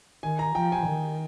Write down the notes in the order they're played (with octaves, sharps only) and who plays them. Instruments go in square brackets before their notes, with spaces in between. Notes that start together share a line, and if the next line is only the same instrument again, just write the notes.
[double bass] D#3 [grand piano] G#5
[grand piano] A#5
[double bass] F3 [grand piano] G5
[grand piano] G#5
[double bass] D#3